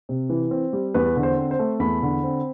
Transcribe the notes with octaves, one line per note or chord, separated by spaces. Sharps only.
C3
E3
C4
G3
E2 B4
D3
C5
C4
C5
A3
E2 B5
D3
C4